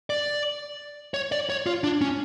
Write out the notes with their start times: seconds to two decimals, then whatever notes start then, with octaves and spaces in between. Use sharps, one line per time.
0.10 D5
1.14 C#5
1.32 D5
1.50 C#5
1.66 F4
1.84 D4
2.01 C#4